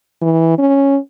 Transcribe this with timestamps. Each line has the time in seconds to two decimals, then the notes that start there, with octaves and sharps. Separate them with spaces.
0.22 E3
0.58 C#4